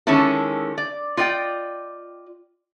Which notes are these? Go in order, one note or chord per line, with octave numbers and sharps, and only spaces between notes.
D3 D#3 G#3 C#4 E4 A5
D5
F4 D5 D#5 G5